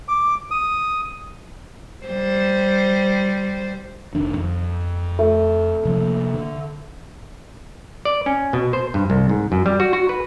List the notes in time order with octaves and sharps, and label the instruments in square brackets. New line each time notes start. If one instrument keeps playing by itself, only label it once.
[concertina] D6
D#6
[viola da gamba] G3 C5
[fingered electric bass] F1 D#3 D4
F2
[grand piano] A3
[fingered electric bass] C3 F3 A#3
D3
[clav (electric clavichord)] D5
C#4
B2
C5
G2
C2
G#2
F#2
G3
F#4
F#4
B4